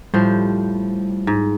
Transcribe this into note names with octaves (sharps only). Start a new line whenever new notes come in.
A2 F3 G3 C5
G#2